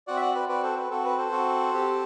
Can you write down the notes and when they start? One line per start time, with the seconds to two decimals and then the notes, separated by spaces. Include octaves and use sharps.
0.07 C4 F#4 D5 F#5
0.17 E5
0.21 D5 F#5
0.35 B4 D5
0.48 C4 F#4 B4 D5
0.63 A4 C5
0.77 B4
0.90 C4 F#4 A4
1.05 B4
1.18 A4 C5
1.32 C4 F#4
1.74 C4 G4